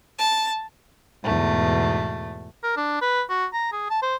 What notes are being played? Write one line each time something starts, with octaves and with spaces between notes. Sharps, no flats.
A5
E2 G#2 B2 A3
A#4
D4
B4
F#4
A#5
G#4
A5
C5